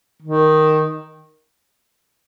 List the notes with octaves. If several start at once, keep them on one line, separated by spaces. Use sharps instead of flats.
D#3